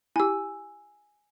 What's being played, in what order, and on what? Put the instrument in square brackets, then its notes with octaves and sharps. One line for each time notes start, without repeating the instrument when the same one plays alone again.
[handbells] E4 G4 [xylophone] G#5 E6